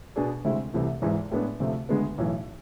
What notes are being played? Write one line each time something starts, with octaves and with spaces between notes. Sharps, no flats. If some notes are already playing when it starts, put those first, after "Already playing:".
B2 B3 D4 G#4 D5
D2 C3 G#3 C4 E4
C2 C3 E3 A3
G#1 G#2 E3
A2 G#3 B3 D4
D2 C3 F3 A3
D2 D3 G#3 B3
B1 A2 E3